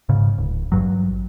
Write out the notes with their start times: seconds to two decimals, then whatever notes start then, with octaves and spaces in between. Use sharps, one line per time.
0.09 G#2 C#3
0.38 D1
0.72 A1 G2 F#3